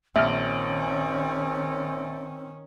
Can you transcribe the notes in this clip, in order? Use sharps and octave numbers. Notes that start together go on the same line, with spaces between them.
A#1 D#3 C4 C#4 E5 F6